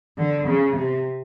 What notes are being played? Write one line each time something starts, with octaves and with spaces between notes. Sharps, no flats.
D3
C#3
C3